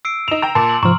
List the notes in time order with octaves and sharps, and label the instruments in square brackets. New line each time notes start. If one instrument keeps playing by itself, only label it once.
[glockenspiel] E6 C7 D7
[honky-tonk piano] D#4 F7 [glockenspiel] E7
[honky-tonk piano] G5 A#5
[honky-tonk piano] A#2 [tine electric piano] A5 [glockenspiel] C6
[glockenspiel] F#7
[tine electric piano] G#2 C3 F3 [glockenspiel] A#5 C6 F6 [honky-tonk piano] C#6